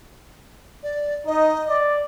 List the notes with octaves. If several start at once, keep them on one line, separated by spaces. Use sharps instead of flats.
D5
D#4 D#5
D5